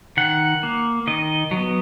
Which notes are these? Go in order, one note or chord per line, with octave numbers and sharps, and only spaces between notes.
D#3 F#5
A#3
D#3 D#5
F#3
B3